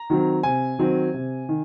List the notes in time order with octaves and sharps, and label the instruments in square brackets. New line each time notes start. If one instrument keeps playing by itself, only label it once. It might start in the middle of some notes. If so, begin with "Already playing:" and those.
Already playing: [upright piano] A#5
D#3 F#3 C4
C3 G#5
D#3 F#3 C4
C3
D#3